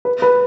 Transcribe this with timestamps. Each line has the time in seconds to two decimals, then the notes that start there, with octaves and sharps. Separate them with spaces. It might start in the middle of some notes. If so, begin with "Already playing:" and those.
0.05 B4
0.22 B4